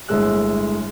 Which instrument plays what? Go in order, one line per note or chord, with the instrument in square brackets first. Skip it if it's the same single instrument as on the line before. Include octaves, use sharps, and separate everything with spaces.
[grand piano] G1 A2 G#3 A3 E6 F#6